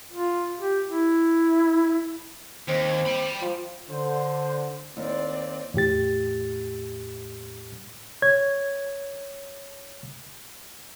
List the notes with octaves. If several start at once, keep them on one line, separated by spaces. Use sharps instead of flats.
F4
G4
E4
D#2 C4
G5 B5
F3
D3 C5
D#2 C4 D5
E2 A2 G4 A6
C#5 G#6